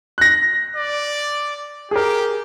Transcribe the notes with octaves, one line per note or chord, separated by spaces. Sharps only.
F#6 A#6
D5
G4 G#4 A#4